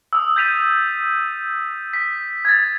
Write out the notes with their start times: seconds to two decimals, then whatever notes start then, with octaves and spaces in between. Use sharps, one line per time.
0.13 D#6 E6
0.36 G6 A6 B6 D#7 F7
1.93 B6
2.45 G#6 A6